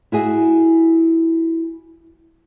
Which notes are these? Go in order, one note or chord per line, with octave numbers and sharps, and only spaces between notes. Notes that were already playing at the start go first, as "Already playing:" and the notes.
E4 F#4 G#4 E5